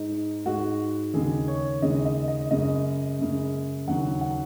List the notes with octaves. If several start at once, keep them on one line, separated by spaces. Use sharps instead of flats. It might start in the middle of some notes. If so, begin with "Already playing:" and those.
Already playing: G#2 G#3 D#4
G#2 G#3 F#4
D#2 C#3 G#3 G#4
C#5
D#2 C#3 G#3 D#5
D#5
D#5
F#2 C#3 G#3 D#5
F#2 C#3 G#3
D#2 C#3 F#3 F#5
F#5